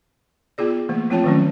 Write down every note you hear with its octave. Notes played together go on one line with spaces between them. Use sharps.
B3 F4 G#4 D5
E3 A3 A#3
F3 A3 C4 F4 C#5 A5
D#3 F#3 A3 C#4